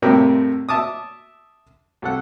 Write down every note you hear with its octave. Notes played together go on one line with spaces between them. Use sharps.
F2 A2 C3 G3 A#3 G5
E5 A5 D6 D#6
C2 A4 F#5